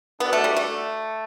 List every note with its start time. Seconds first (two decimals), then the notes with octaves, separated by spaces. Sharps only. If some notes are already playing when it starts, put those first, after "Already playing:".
0.20 B3 D4 F#4 A4 D5 F#5
0.33 A3
0.44 G3
0.57 A3